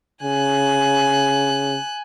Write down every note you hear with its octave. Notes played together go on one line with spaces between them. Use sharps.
C#3 G#5 F#6